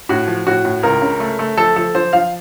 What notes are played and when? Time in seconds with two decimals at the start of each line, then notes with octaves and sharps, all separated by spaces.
0.09 A2 F#4
0.27 F3
0.47 A2 F#4
0.65 A2
0.83 C#2 A#4
1.02 C#3
1.20 A3
1.39 A3
1.57 F3 A4
1.76 F3 A4
1.95 F3 C5
2.13 F3 F5